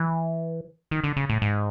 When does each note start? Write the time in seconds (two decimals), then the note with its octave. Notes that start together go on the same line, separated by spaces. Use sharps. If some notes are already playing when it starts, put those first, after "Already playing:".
Already playing: E3
0.91 D#3
1.04 D3
1.16 C#3
1.30 A2
1.42 G#2